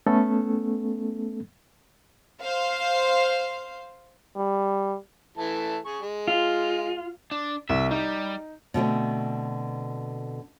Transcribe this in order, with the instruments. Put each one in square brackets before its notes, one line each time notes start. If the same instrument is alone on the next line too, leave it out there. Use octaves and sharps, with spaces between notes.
[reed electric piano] A3 B3 C#4 A4
[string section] C5 F5
[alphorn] G3
[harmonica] E3 A3 A5
G#4 C#6
G#3
[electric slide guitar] F4
[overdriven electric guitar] D4
[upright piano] C2 [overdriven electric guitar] E5
[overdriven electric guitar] G3 [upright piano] D#4
[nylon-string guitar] B2 D3 A3 C4